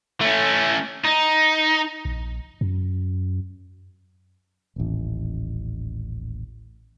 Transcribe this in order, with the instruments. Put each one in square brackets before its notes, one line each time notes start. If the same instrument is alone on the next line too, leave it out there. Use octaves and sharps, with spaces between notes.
[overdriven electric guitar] A3 C#4
D#4
[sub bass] A#1
F#2
[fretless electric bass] D#1 A1